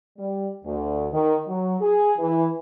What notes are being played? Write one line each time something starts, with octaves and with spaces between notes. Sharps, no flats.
G3
D2
D#3
F#3
G#4
E3